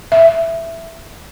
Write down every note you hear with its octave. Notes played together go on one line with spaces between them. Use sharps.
E5